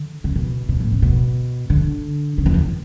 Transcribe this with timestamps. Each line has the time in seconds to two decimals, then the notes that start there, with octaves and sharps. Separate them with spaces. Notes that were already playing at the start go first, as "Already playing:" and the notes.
Already playing: D3
0.24 C#3
0.36 B2
0.69 B2
0.80 A2
0.92 C#3
1.02 B2
1.70 D3
2.38 C#3
2.46 E2
2.54 F#2